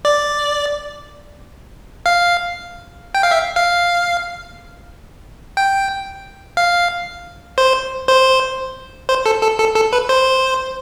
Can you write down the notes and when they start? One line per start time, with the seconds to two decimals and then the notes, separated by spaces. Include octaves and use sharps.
0.05 D5
2.06 F5
3.15 G5
3.23 F5
3.31 E5
3.56 F5
5.57 G5
6.57 F5
7.58 C5
8.08 C5
9.09 C5
9.26 A4
9.42 A4
9.59 A4
9.75 A4
9.93 B4
10.09 C5